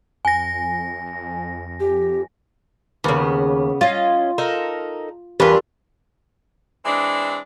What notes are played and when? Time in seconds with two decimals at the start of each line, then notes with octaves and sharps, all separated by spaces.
0.25 F2 G#5 A#6
1.80 G4
3.04 D#2 C#3 B3
3.81 C#4 F4 D#5
4.38 D#4 A4 A#4
5.40 E2 D4 F4 G4 A#4 B4
6.84 E3 G#3 C4 D4 D5